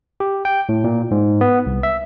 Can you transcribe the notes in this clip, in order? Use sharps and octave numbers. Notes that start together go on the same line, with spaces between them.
G4
G5
A2
A#2
G#2
B3
C2
E5